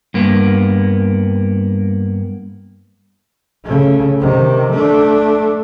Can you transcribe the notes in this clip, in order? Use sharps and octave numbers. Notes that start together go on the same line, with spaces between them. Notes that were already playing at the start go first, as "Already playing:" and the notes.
G2 A#3 B3
C#3 A3
C3 D#3
A3 D4